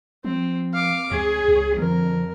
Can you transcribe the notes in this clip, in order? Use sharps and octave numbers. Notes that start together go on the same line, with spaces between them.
F3 C4
F5 D6
D2 G#4 C#5
C#2
F2 D3 A#4